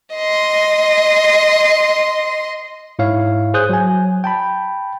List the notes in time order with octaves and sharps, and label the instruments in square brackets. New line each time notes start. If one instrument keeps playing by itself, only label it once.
[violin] D#5 C6
[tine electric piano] G#2 E4 C#5 F5
G#4 C5 D#6 F#6 G6
F#3 G#5
G5 A5 B5